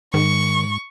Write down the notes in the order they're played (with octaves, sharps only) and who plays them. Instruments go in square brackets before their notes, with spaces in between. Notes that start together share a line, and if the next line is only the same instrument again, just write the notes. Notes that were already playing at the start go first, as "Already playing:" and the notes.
[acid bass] G#2 [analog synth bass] D#3 [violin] C#6